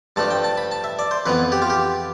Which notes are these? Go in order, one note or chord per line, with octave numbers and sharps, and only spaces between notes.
G2 F3 A3 D4 A5
G5
A5
B5
A5
E5
D5
C5
F2 E3 B3 B4
G4
F4
G4